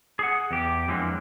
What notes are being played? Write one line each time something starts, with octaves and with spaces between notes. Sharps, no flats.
G#4 F#5
E2 G4
F2 D3 E3 F#3 G#3 A#3